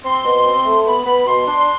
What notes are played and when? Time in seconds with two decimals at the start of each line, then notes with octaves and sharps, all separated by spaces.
0.04 C4 C6
0.24 B2
0.45 C4
0.65 A3
0.85 B3 B5
1.06 B3 B5
1.26 B2 C6
1.47 D4